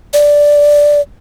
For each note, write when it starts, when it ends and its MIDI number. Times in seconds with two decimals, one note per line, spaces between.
0.14 1.01 74